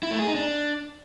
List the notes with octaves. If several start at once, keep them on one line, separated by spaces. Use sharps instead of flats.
E4
A3
G#4
D#4
D4